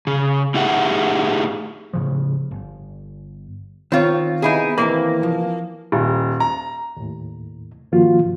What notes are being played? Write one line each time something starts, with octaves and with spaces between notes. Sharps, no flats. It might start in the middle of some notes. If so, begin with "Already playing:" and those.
C#3
A2 D#4 G4 G#4 E5 F#5
A2 C#3 F3
G1
D#3 C4 F4 C#5
C3 E3 B3 D#4 E4 G#4
D#2 C3 E3 A#3 B5
F3
D#1
A#5
D#2 A2
G2 D#3 F3 A#3 F4 F#4